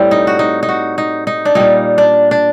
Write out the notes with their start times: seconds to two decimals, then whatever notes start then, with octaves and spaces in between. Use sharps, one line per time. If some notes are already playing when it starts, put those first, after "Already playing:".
Already playing: A2 G3 C4
0.11 D#4
0.27 F#4
0.39 D#4
0.63 D#4
0.69 F#4
0.98 D#4
1.27 D#4
1.45 D4
1.55 A#2 G3 A#3 D#4
1.98 D4
2.31 D4